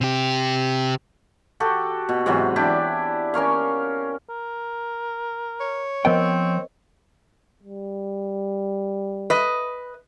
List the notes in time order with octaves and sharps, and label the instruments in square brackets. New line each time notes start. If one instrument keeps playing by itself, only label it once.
[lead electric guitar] C3 G4
[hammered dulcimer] F#4 G4 A4
B2
G#2 C3 E3 F#3
D4 E4 G4 D5
C#4 A#4 C#5 F5
[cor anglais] A#4
[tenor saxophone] C#5
[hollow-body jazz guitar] F3 B3 G5 [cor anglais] C4 [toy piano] A#4 C5 D#5
[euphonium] G3
[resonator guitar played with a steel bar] B4 D#5